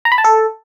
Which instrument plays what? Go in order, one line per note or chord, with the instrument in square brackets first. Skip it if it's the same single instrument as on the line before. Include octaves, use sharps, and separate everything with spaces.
[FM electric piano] A#5
B5
A5
A4